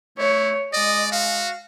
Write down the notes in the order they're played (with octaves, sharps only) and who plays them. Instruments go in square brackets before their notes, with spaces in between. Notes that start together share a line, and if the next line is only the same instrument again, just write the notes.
[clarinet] A3 [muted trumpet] E4 [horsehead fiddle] C#5
[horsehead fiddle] G#3 [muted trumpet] D5 [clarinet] D#5
[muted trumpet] F#4 [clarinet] F5